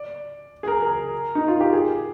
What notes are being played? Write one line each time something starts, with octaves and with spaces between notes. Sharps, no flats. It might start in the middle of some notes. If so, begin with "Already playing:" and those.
Already playing: D5
G#4
A#4
A#4
D#4
F4
G4
G#4